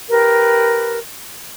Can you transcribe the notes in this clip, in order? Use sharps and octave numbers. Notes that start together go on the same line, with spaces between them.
G4 A#4 B4